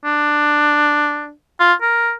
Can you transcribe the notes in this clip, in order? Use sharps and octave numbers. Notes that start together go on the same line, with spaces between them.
D4
F4
A#4